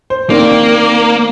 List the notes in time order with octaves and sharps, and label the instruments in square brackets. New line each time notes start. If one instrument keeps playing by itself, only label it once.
[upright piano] C5
[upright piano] D#3 C4 D4 [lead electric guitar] A#3